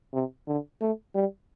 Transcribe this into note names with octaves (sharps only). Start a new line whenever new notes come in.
C3
D3
A3
G3